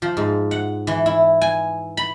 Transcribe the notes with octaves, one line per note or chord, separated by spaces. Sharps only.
F3
G#2
F#5
E3
E4
G#5
B5